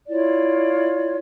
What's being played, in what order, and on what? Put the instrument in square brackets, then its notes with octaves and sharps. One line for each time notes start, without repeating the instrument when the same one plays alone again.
[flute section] E4 F4 C#5 D5